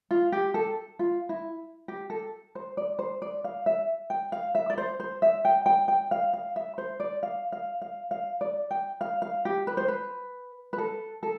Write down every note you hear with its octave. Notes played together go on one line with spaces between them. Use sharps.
F4
G4
A4
F4
E4
G4
A4
C5
D5
C5
D5
F5
E5
G5
F5
E5
D5
C5
C5
E5
G5
G5
G5
F5
F5
E5
C5
D5
F5
F5
F5
F5
D5
G5
F5
F5
G4
B4
C5
B4
B4
A4
A4